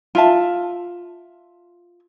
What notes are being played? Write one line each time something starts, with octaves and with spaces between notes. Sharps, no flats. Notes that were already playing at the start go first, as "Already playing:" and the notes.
F4 E5 A5